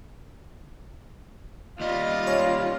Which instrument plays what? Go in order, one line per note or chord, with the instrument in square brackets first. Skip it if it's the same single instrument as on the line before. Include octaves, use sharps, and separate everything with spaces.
[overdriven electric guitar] D#2 G3 [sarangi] F4 [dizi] D#5
[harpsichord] C#4